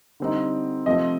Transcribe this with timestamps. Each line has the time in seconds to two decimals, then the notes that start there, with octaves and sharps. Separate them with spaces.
0.20 D3 G3 C4 D#4
0.86 C3 F3 A3 C4 D#5